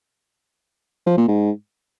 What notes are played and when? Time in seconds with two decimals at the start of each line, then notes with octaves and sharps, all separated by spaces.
1.07 F3
1.17 A#2
1.28 G#2